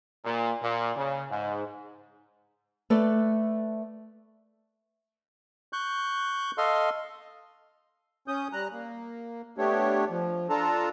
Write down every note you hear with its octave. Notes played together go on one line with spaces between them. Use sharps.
A#2
A#2
C#3
G#2
A3 A4 B4 D5
C#6 F#6 G6
A4 D#5 F5 C6
C#4 D#6 G6
G3 A#5 F#6
A#3
A3 B3 D4 G4 C#5
F3
D4 F4 A4 A5 A#5